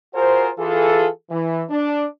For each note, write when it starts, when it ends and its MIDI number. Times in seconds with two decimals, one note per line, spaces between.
0.14 0.50 65
0.14 0.50 66
0.14 0.50 68
0.14 0.50 70
0.14 0.50 72
0.59 1.08 52
0.59 1.08 65
0.59 1.08 68
0.59 1.08 69
1.31 1.63 52
1.70 2.05 62